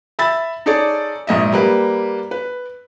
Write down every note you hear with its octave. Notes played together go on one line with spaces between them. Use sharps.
E5 B5 E6 A6
D#4 G#4 A4 C#5 D5
A#1 G#2 D#5 E5
G3 A#3 B4
B4